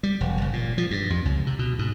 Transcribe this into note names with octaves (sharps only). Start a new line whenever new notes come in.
G3
E1
F#1
A#2
F3
G2
F2
C#2
C3
B2
G#2